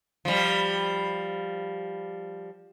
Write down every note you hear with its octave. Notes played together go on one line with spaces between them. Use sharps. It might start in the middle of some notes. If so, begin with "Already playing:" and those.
F3 G3